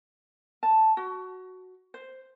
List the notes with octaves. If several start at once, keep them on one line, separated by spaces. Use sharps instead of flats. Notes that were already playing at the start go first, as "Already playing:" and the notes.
A5
F#4
C5